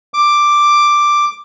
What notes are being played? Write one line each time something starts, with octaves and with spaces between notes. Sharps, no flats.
D6